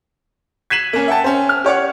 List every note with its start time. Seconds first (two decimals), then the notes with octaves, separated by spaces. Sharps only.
0.70 G#6 B6 C7 D#7 E7 F#7
0.93 A#3 C#4
1.08 E5 F#5 G5 A5
1.24 C#4 C5
1.49 F6
1.64 G4 C#5 D5 F#5